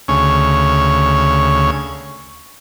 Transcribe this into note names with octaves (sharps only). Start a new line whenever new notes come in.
D2 C#3 C#5